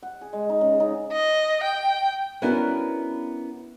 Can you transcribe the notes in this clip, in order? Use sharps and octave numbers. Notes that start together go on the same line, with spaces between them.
F#5
G#4
G#3
D#4
C#3
D#4
D#5
G5
B3 C#4 D4 E4 F#4 A#4